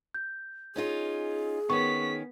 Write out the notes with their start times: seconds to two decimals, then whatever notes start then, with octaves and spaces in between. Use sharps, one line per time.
0.14 G6
0.76 C#4 D#4 F4 G#4
1.70 D#3 B3 C#4 C#6 B6